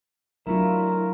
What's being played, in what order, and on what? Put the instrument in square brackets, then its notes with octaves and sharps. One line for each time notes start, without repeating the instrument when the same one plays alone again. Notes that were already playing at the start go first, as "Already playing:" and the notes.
[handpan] F#3 D4 F4 [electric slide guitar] A3 E4 [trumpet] A#4